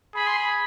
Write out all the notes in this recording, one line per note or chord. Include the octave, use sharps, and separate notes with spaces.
G#4 B5
C6
B5